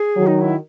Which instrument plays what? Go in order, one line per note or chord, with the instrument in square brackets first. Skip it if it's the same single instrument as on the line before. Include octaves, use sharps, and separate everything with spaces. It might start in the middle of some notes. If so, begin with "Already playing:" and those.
Already playing: [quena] G#4
[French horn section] D#3 F#3
[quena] D#4
E4